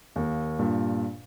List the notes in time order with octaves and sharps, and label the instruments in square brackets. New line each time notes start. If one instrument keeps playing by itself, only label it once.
[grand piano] D#2 A#3
G2 A#2